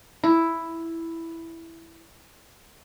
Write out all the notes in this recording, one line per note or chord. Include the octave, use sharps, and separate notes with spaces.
E4